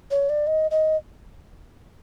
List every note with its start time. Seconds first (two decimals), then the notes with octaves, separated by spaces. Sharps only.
0.11 C#5
0.29 D5
0.47 D#5
0.71 D#5